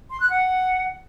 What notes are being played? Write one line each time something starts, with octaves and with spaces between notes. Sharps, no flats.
C6
F#6
F#5